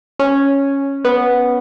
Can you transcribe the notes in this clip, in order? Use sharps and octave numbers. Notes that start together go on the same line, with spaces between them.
C#4
B3